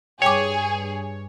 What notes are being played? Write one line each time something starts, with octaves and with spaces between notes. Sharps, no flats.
G2 G#4 C#5 G5 D6